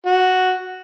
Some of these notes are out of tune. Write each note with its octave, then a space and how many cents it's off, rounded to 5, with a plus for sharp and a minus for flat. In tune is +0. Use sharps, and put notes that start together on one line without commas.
F#4 +0